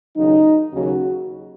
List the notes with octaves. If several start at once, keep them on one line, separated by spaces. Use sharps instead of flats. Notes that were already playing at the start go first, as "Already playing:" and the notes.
D#2 C#3 F#3 D#4
D#2 C#3 F#3 F#4